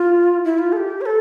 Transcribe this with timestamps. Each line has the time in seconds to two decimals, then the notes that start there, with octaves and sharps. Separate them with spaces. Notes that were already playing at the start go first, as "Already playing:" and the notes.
Already playing: F4
0.45 E4
0.58 F4
0.72 A4
0.77 G4
1.01 C#5
1.06 A4